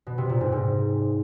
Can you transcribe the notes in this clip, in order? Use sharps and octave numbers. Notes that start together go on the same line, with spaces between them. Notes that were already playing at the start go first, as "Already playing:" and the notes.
B2
C3
A#2
G#2
G#2